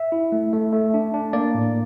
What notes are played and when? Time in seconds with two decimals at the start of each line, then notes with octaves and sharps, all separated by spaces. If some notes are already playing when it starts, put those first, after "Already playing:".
Already playing: E5
0.12 E4
0.32 A3
0.53 A3
0.73 A3
0.94 D4
1.14 D4
1.33 A#3 D5
1.54 A2